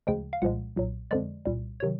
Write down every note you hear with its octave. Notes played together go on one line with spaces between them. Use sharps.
D2 C#3 F3 G#3 G5
F5
C2 A#2 F3 G#3 F#5
B1 A#2 F#3
F2 D3 F3 G#3 D5
C2 A#2 G3
C3 D#3 F#3 C#5